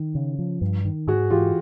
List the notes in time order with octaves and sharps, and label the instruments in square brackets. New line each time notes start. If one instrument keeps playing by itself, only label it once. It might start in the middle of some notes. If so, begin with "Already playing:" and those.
Already playing: [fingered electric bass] D#3
C#3
F3
G2
D#3
[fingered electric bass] G#2 [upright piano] F#4 G#4
[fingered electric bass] E3 [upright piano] F4 G4